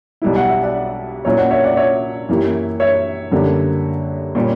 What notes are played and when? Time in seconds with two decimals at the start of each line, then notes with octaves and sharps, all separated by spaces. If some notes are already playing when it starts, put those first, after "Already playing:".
0.22 B1 B2 G3 B3 E4
0.36 F#5
0.49 E5
0.63 D5 F#5
1.25 A#2 F#3 C#4 E4 C#5 E5
1.38 D5 F#5
1.51 C#5 E5
1.64 D5 F#5
1.77 C#5 E5
2.29 F#2 E3 A#3 E4 G4
2.80 C#5 E5
3.32 F#2 D3 G3 A#3
4.35 A#2 G3 C#4 G4